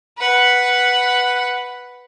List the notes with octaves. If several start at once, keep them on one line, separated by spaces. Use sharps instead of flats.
B4 F#5